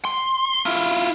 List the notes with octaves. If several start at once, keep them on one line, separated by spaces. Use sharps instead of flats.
C6
E4 F4